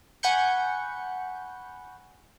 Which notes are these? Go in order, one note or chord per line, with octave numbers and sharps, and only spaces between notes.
F#5 G#5 B5 C#6 G6 C#7